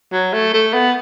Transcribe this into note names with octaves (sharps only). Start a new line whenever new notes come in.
F#3
A3
A3
B3